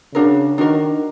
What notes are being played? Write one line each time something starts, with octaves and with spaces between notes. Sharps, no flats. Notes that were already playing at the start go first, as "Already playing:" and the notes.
C#3 D4 F#4 A#4
D#3 D4 F#4 A#4